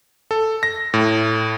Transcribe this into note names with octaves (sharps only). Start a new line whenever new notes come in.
A4
A#6
A2